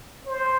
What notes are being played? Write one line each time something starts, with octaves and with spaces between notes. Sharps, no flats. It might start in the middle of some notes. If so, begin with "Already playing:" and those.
C5